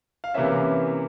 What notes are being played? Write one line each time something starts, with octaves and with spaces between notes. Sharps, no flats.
F5
C3 E3 A#3 C#4 E5